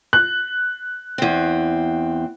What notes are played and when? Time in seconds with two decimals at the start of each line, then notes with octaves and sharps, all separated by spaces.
0.13 F#6
1.18 E2 C4